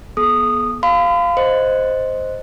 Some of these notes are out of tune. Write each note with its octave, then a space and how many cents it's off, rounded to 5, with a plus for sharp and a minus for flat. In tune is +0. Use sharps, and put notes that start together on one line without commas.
B3 -35 G#4 +45 D#6 -15
F5 -5 B5 +45
C5 +0 D#5 +0